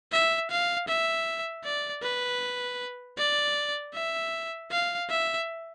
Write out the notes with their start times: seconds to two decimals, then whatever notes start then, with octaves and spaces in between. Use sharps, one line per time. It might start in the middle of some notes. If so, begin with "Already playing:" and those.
0.12 E5
0.51 F5
0.88 E5
1.64 D5
2.03 B4
3.18 D5
3.94 E5
4.71 F5
5.09 E5